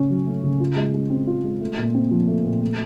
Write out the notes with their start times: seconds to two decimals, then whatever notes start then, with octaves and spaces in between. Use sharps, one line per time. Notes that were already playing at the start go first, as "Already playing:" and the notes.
Already playing: C#3 A3 C#4
0.10 F#3
0.26 A3
0.44 C#3
0.60 F4
0.76 G#3
0.94 G#3
1.10 C4
1.27 F4
1.44 G#3
1.61 A3
1.77 A#2
1.94 C4
2.11 F3
2.28 A3
2.45 A#2
2.62 A3